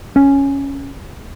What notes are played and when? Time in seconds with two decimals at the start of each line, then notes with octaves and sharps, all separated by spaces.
0.16 C#4